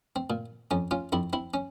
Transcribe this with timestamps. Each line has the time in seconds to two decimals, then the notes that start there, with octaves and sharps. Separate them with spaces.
0.16 C4
0.30 A#2
0.71 F2 C#4
0.91 C#4 F4
1.12 F2 C4 E4
1.33 C4 E4
1.54 C#4